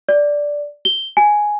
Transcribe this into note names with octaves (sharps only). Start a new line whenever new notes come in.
D5
G7
G#5